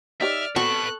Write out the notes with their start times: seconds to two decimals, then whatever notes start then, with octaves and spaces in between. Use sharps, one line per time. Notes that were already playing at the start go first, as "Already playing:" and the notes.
0.21 D#4 G4 C#5 D5 E5 F6
0.56 B3 C4 F#4 A4 B4 A5 C#6 F#6